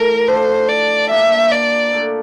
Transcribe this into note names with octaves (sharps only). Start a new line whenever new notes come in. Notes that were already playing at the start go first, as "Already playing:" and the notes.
Already playing: A2 E3 A3 A#4
F3 A3 D4 A4 C5
D5
A#2 G3 A#3 D4 E5
D5
A#2 A3 D4